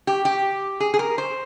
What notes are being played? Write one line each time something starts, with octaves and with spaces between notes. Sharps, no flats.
G4
G4
G#4
G#4
A#4
C5